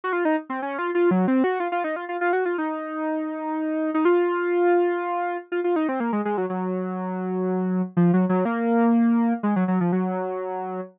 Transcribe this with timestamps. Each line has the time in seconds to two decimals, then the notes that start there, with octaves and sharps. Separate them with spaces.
0.04 F#4
0.13 F4
0.25 D#4
0.50 C4
0.62 C#4
0.79 F4
0.95 F4
1.11 F#3
1.28 C4
1.44 F#4
1.60 F4
1.72 F4
1.84 D#4
1.96 F4
2.09 F4
2.21 F4
2.33 F#4
2.45 F4
2.58 D#4
3.94 D#4
4.05 F4
5.52 F4
5.64 F4
5.76 D#4
5.89 C4
6.00 A#3
6.13 G#3
6.25 G#3
6.38 F#3
6.50 F#3
7.97 F3
8.14 F#3
8.29 F#3
8.45 A#3
9.43 G#3
9.56 F#3
9.68 F#3
9.81 F3
9.92 F#3